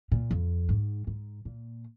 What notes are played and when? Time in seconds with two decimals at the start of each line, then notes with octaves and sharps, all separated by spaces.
0.12 A#2
0.31 F2
0.69 G#2
1.07 G#2
1.45 A#2